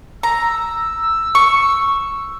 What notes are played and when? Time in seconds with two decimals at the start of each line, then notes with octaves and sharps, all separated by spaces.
0.23 A#5 E6
1.35 C#6